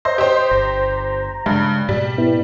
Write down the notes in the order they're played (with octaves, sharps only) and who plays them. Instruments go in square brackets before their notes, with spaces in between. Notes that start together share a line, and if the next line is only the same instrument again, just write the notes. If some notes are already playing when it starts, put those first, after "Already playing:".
[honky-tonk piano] C5 [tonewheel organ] D#5 E5 A#5
[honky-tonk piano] G4 C5 [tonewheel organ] D#5
[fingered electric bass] G1 [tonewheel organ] A#5
[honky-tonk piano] G2 [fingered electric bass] C#3 G#3
[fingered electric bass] G#2 B2 [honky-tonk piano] G3
[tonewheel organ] B3 E4